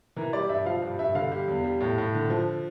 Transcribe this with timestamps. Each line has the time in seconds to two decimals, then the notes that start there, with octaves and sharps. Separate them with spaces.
0.16 E3 A#4
0.33 G3 D5
0.49 G2 E5
0.65 F3 F5
0.82 G2
0.99 G2 E5
1.15 D3 F5
1.32 G3
1.48 E2
1.64 G3
1.80 A2
1.98 A2
2.14 D3
2.30 F3